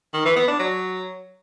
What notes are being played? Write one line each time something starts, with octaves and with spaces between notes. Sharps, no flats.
D#3
E3
B3
D4
F#3